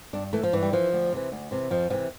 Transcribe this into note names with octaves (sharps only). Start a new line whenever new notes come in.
G2 D4
E3 A3
F3
G2 E3
G3
E3 F3
D2
C3 E3
D2
C3 E3
F2 F3
C3 E3 F3